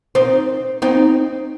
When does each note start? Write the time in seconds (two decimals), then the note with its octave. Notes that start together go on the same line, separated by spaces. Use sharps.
0.15 C4 D#4
0.82 C4 D#4